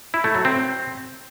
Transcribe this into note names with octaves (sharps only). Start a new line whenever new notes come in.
E4
A3
F#3
C4